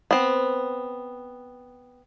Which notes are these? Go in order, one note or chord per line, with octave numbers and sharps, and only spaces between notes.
B3 C4